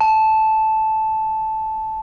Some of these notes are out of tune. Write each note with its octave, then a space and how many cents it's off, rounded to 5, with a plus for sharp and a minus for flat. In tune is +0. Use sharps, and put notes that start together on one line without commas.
A5 -10